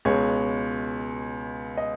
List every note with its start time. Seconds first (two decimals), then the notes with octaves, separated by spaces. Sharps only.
0.05 C#2 B2 G#3 C#5
1.77 D#5